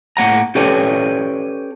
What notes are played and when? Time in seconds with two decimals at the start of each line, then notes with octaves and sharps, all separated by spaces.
0.17 A2 A#3 F#5 A#5
0.55 C#4 G4 A4 B4 C#5 D5